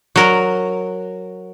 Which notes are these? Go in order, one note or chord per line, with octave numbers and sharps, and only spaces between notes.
F#3 A#4